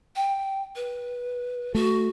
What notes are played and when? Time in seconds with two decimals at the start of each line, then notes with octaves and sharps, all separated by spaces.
0.16 G5
0.76 B4
1.75 A3 F#4